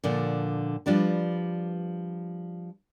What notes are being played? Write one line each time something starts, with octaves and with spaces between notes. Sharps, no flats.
A#2 D3 F3
F3 G3 D4 B4